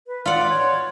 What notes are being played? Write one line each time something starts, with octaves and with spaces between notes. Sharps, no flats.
B4
F4 D5 F#5
C#5